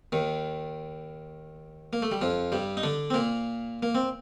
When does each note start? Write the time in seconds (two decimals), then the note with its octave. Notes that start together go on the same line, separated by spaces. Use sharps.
0.12 D#2 D#3
1.93 A#3
2.02 A3
2.12 G3
2.22 F2 F3
2.52 G2 G3
2.77 D#4
2.83 D3 D4
3.10 C4
3.14 A#2 A#3
3.83 A#3
3.95 C4